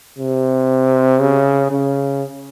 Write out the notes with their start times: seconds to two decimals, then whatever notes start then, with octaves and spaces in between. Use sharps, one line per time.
0.19 C3
1.20 C#3
1.71 C#3